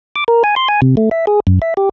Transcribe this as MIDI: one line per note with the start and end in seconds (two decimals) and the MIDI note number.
0.16 0.24 86
0.28 0.43 70
0.44 0.55 80
0.56 0.68 84
0.68 0.81 80
0.82 0.95 48
0.97 1.09 57
1.11 1.25 76
1.27 1.40 68
1.47 1.59 42
1.62 1.74 76
1.77 1.89 67